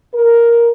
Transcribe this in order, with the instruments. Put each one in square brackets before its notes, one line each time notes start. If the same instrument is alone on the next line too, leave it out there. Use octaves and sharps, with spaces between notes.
[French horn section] A#4